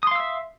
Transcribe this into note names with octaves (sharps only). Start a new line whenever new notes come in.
E5 F5 C6 D#6 E6